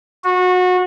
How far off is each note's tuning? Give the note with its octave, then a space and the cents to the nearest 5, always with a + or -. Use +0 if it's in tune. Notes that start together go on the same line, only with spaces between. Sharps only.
F#4 -25